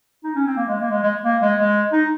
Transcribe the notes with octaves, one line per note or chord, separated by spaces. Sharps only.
D#4
C#4
C4
A#3
G#3
A#3
G#3
G#3
A#3
G#3
G#3
D#4